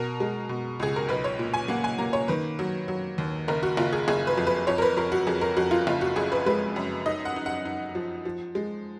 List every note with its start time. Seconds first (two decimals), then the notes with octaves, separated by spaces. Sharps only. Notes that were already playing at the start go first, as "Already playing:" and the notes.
Already playing: B2 A#4
0.20 G#3
0.49 B2
0.80 C#2 G#4
0.96 A#4
1.09 B1 B4
1.24 C#5
1.39 A#2
1.54 G#5
1.68 A#3 F#5
1.84 G#5
1.98 A#3 A#5
2.13 C#5
2.28 D#3 B4
2.59 F#3
2.88 F#3
3.18 D#2
3.48 F#1 A#4
3.63 F#4
3.77 F#1 F4
3.93 G#4
4.08 F#1 G#4
4.27 B4
4.37 F2
4.47 B4
4.67 F2 C#5
4.78 A#4
4.82 B4
4.97 F2 A#4
5.12 F#4
5.27 F2 G#4
5.41 A#4
5.57 F2 F#4
5.71 F4
5.87 F#1 F4
6.01 F#4
6.16 F#2 G#4
6.32 B4
6.46 G#3 B4
6.76 F#2
7.06 D#4 D#5
7.25 F#5
7.36 D#4
7.46 F#5
7.65 D#4
7.95 F3
8.25 F3
8.55 G#3